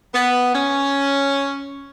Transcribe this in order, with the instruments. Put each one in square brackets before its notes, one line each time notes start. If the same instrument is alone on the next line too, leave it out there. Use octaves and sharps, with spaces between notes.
[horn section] B3
C#4